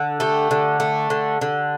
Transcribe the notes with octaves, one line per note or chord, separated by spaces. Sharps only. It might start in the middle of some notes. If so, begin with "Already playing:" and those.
Already playing: D3
A3 G4
D3
A3
D3
D3